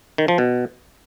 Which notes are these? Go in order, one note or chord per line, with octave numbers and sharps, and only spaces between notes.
D#3
F3
B2